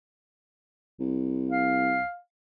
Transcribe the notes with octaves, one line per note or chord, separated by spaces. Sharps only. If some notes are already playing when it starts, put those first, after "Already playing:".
C2
F5